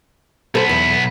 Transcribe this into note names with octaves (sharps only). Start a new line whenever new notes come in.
B1 B3 A4 C5
E2